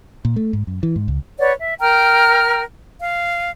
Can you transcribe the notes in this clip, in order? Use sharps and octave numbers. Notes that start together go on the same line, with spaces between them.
A#2
A3
G#2
F#2
E3
G#2
C#2
B4 C#5 D5 F#5
E5
A#4 G5 A#5 F6
F5